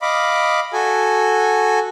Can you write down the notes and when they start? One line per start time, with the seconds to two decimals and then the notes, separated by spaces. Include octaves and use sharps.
0.02 D#5 F5 B5 D6
0.73 F#4 A4 G#5